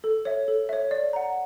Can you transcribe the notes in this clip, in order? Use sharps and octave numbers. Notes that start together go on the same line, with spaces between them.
A4
C#5 E5
A4
C#5 E5
D5
F#5 A#5